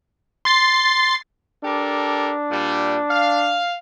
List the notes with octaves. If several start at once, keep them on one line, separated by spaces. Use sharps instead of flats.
C6 A6 C7
D4 G4 A4 A#4
A#2 G3
F5